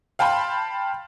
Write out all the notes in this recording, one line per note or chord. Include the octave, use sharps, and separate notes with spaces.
F5 G5 A5 B5 C6